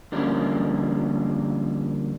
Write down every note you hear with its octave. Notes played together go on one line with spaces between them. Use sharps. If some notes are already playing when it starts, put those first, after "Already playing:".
D3 F3 G3 A#3 C#4